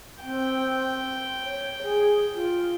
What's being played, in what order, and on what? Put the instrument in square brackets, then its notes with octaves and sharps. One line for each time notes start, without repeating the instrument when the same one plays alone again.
[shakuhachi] C4 [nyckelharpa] G5
[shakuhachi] C#5
G#4
F4